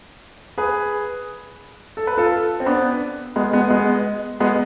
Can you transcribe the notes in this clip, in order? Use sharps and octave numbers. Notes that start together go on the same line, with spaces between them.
G#4 B4
A4
B4
F4 A4
C4
B3 D4
G#3 B3
G#3 B3
G#3 B3
G#3 B3